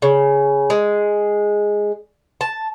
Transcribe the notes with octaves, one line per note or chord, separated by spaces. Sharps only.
C#3
G#3
A5